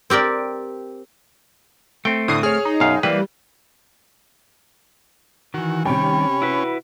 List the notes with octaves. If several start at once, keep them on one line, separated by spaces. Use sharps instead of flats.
C4 G4 A#4 D5
A3 C4 G5
A2 D3 D#6 C7
G#4 C#5 F6
D#4
F#2 B2 F5
E3 G3 A#3 B4 C5
D#3 E3 F#4
C3 D#3 G3 C#4 G5 B5
E4 F#4 B4